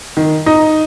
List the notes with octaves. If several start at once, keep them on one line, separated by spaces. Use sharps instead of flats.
D#3
D#4